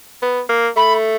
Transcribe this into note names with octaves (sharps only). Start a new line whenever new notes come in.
B3
A#3
A3 B5